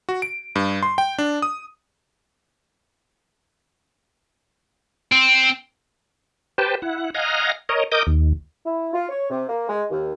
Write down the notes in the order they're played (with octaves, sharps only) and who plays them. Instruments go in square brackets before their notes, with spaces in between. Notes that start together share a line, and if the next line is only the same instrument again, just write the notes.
[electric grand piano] F#4
D7
G2
C6
G5
D4
D#6
[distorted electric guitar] C4
[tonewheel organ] G4 B4 C5 G5 A5
E4 F#5
D#5 F5 F#5 G#5 A#5
A#4 C#5 D#5
A#4 D#5 D6 D#6 G6
D#2
[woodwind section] E4
F4
C#5
C3
A#3
G#3
D#2